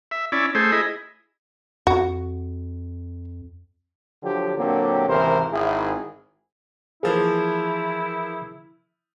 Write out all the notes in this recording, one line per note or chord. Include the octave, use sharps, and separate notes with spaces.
E5
C#4 E4 D5
A3 G#4 C5
E4 G#4 D#5
F2 F#4
D3 F3 F#3 G4
A#2 D3 F#3 A#3 C4 G4
G#1 E2 C3 E3 A#4 C5
G#1 E4 G#4
E3 F3 A#3 E4 G#4